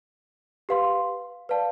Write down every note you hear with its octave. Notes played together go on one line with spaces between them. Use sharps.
G4 B4 F5 C6
B4 D5 F5 A5